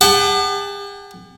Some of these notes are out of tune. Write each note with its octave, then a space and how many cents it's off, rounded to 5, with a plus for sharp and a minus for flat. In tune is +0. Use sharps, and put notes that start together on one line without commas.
G4 +45 F#5 +30 A5 +0